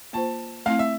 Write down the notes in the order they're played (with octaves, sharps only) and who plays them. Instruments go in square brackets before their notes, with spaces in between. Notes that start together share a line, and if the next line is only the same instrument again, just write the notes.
[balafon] A#3 F4 C5 [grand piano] A5
[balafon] A3 C4 E4 [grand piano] F5
[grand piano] E5